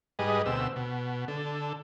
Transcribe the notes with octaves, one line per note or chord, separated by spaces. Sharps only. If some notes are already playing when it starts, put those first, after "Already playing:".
G#2 G3 G#4 B4 D#5
D2 B2 C4 E6
B2
D3 A4